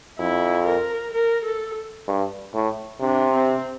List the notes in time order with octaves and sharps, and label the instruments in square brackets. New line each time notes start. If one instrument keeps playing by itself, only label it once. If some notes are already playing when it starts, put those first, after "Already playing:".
[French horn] F2 [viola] E4
[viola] A#4
A#4
A4
[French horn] G2
A2
[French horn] C3 [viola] D4
[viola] C4